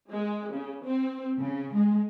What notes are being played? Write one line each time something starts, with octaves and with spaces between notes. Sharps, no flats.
G#3
C#3
C4
C#3
G#3